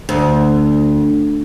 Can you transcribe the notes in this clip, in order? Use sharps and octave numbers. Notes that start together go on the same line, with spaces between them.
D2